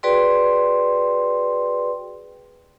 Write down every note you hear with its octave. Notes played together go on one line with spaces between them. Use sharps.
F#4 G#4 B4 D5 G5 C6